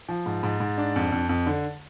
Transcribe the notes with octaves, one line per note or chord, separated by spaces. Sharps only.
F3
G#2
G#2
G#2
D4
F2
F2
F2
D3